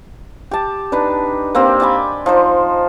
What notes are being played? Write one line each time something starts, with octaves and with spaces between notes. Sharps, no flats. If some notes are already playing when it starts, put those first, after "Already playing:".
G4 A5
D4 D#4 B4 D5
A#3 C4 G4
D5 G5 G#5 B5
F3 D#4 C5